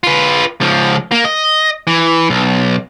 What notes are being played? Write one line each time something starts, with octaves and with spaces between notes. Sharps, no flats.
F4 B4
C#2 F3
A#3
D#5
E3
B1